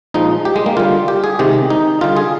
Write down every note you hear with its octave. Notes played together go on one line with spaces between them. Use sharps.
A#2 F3 G#3 D#4
G4
G#3
A#3
D3 G3 F4
G4
G#4
C3 D#3 G#3 G4
D#4
D3 G3 F4
G#4